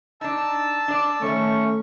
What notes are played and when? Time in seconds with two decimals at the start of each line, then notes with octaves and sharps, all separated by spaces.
0.21 D4 D#4 A5 E6
0.88 D4 D5
1.22 D#3 E3 A3 C#4 C#6